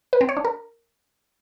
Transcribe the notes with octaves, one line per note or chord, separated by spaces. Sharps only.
B4
C4
C#5
D4
A#4